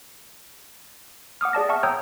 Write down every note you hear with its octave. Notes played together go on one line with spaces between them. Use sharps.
F#5 D6 D#6 F6
G#4 D5 A5 A#6
E5 F#5 A5 C#6 F6
C#5 G5 A#5 D#6 E6 G6